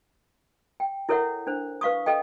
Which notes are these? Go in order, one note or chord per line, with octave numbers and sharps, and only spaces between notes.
G5
E4 A4 A#4 C#5 E5 F#5
D4 C5
B4 F5 C#6 D#6
A4 D#5 G5